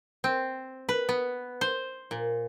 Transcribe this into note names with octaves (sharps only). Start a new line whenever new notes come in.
C4
B4
B3
C5
A#2